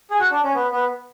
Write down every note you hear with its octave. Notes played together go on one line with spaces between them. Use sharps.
G#4
F#4
D4
C#4
B3
B3